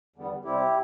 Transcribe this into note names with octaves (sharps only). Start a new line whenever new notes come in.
E2 D3 G3 B3
C3 G3 C4 E4 G4